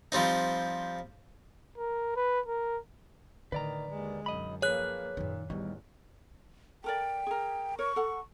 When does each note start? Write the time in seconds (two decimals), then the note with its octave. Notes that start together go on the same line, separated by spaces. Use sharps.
0.12 F3 G3 C4 D#4
1.78 A#4
2.16 B4
2.46 A#4
3.52 A2 D3 D#3 B4 D5 A#5
3.90 D#2 G#3
4.26 B1 F#2 D#5 B5
4.62 F3 A#3 G#4 B4 C#5 F#6
5.17 F#2 A#2 D#3
5.50 A1 E2 D#3 G3 B3
6.84 A4 A#4 D5 G5
7.27 G#4 A#4
7.79 A#4 C#5 C#6
7.96 A4 F#5